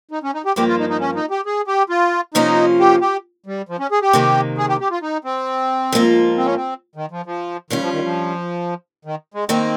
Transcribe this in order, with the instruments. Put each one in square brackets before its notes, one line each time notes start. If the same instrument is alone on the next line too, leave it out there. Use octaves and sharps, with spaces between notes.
[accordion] D#4
C#4
D#4
G4
[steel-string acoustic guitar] G2 F3 A#3 [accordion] G4
[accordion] F4
D#4
D#4
C#4
D#4
G4
G#4
G4
F4
[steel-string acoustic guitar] C3 F3 A#3 C#4 F4 [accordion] D#4
[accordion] G4
G4
G3
F3
C#4
G#4
G4
[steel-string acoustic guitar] C3 D#3 A#3
[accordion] G#4
G4
G4
F4
D#4
C4
[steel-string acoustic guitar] G#2 F3 A#3 F4
[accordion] C4
C#4
C4
D#3
F3
F3
[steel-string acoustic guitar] G2 G3 C#4 F4 [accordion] D#3
[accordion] F3
D#3
F3
D#3
G#3
[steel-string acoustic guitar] D#3 A#3 D#4 [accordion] C4